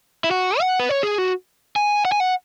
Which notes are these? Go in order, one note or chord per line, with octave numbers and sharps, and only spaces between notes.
E4
F#4
F#5
B4
C#5
G#4
F#4
G#5
F#5
G#5
F#5